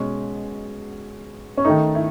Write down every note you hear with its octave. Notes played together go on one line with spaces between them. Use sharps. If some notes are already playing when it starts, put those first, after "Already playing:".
Already playing: B2 G#3 C#4
C#4
D#3 A3 D#4
E4